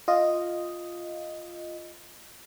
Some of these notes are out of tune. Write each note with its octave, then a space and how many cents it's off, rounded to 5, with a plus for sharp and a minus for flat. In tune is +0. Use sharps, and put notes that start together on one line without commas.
F4 +0 D#5 +0